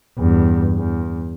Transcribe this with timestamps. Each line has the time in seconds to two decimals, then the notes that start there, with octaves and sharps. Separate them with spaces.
0.18 E2 G2
0.78 E2